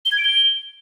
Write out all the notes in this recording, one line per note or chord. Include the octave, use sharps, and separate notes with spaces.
G7
G#6
D7
G7